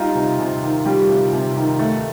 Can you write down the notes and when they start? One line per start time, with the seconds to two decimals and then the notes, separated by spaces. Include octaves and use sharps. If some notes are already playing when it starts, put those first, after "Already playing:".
Already playing: G3 D#4 F4
0.15 C3
0.39 C3
0.62 D#3
0.86 G3 F4 G4
1.09 C3
1.33 C3
1.56 D#3
1.79 A3